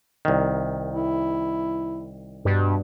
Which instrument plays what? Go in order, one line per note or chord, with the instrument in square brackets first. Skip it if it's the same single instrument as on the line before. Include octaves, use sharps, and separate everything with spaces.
[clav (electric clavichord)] C2 D#3
[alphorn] E4
[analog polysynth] G2 [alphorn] B2